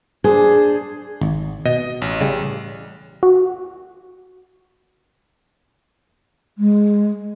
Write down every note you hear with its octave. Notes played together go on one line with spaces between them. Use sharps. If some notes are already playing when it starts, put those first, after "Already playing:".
D4 G#4 C5
G#1
B2 D#5
A1
C#3 G3
F#4
G#3